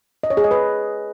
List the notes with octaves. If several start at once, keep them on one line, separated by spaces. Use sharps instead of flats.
D#5
C#5
G#4
D#5
B4